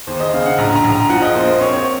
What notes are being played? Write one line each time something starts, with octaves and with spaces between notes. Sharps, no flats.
D#2 C5
D#5
C#3 F5
F#5
A#1 A#5
A#5
A#1
A#5
F3 F#5
D#5
A#3 C5
C5
C4 C#5
C#5